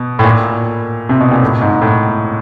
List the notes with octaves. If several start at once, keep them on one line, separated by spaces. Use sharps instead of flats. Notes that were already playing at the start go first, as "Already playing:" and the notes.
Already playing: B2
A2
A#2
C3
B2
A#2
A2
G#2
A2